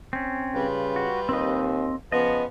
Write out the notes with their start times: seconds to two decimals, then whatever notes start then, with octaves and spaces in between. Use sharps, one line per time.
0.13 C4 C#4
0.55 C#3 G3 F4 B4
0.96 F#4
1.29 D#2 C4 D#5
2.12 C#3 F3 B3 B4 D#5